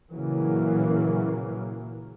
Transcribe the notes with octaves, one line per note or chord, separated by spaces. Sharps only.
A#2 C#3 E3 F#3 A#3